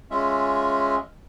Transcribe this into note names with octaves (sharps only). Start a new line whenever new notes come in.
G#3 C#4 F4 E5